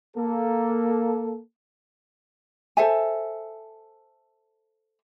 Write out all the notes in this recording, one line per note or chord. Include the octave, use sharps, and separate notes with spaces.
A#3 A4
A4 C5 E5 G#5